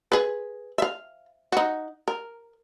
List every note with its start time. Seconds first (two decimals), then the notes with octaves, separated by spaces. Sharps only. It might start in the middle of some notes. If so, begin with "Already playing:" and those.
0.12 G#4 B4
0.78 E5 F5
1.52 D#4 F#4
2.08 A#4